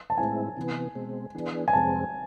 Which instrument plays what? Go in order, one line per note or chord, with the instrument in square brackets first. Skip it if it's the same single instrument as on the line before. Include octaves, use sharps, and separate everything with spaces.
[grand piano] A5
[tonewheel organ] A2 G#3 C4 E4 [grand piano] G#5
[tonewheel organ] C3 E3 B3
B2 G#3 C4
E3 B3 D4 G#4
[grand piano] G#5
[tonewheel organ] F2 C3 G#3 C4 [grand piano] A5